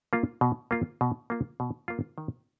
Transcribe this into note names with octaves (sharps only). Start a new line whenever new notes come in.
A#3 F4
B2
A#3 F4
B2
A#3 F4
B2
A#3 F4
D#3